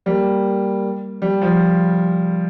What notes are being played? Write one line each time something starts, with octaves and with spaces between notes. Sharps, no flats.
G3 A#3
G3
F3